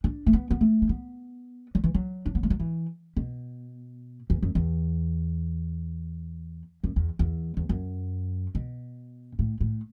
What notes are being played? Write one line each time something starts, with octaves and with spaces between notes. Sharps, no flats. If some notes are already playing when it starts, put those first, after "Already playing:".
D4
A3
B3
B3
A3
D4
B3
F#3
E3
F#3
D4
B3
A3
F#3
E3
B2
E2
F#2
E2
F#2
E2
E2
E2
F#2
B2
A2
A2